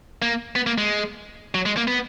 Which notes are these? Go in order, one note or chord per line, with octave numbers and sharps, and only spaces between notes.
A#3
B3
A#3
G#3
F#3
G#3
A#3
B3